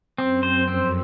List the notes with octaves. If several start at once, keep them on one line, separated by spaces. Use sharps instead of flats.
F#2 C4
C5
F2 C4